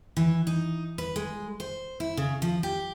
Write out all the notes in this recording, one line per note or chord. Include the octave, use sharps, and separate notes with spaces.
E3
D#4
B4
G#3
C5
E4
C#3
F3
G4